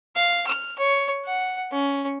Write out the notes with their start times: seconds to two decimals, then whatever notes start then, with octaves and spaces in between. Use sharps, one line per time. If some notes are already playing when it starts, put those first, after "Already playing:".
0.16 F5
0.47 F6
0.79 C#5
1.25 F#5
1.72 C#4